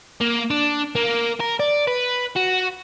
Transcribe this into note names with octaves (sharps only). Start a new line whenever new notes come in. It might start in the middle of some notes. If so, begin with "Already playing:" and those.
A#3
D4
A#3
A#4
D5
B4
F#4